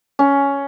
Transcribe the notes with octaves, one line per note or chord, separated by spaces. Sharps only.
C#4